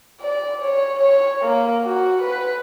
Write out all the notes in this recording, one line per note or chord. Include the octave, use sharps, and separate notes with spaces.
D5
C#5
C#5
A#3
F#4
B4